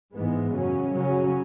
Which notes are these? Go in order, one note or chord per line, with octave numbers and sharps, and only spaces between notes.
G#2 E3 G#3 B3
F#2 C#3 F#3 C#4
C#3 F#3 C#4